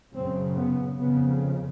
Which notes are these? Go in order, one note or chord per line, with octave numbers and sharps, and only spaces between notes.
F#2 C#3 C4
B3
F2 C#3 B3